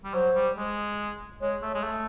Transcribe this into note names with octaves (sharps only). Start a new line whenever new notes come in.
G3
F#3 C5
G3
G#3
G#3 C#5
A3
G#3
A3